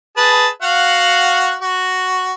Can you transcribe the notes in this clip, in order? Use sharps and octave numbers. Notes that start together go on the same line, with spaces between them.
G#4 B4 A5
F#4 F5 F#5
F#4